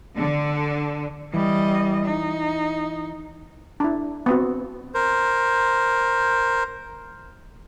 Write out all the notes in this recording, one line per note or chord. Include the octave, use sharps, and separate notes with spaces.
D3
E3 G3 D#5
D#4
D4 E4
B3 C4 F#4
A#4 C5